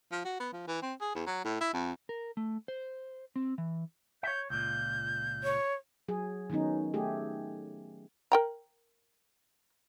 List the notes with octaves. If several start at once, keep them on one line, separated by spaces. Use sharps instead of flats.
F3
F#4
B3
F3
E3
C4
G#4
E2
F#3
A2
E4
F2
A#4
A3
C5
C4
E3
C#5 E5 G6
C#2 A#2 G6
C#5
F#3 G#4
D#3 F#3 B3 C#4 D#4
A3 G4 G#4
A#4 G5 A#5